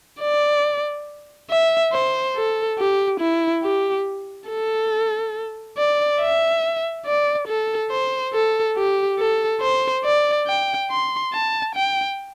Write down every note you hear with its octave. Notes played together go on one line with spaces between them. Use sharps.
D5
E5
C5
A4
G4
E4
G4
A4
D5
E5
D5
A4
C5
A4
G4
A4
C5
D5
G5
C6
A5
G5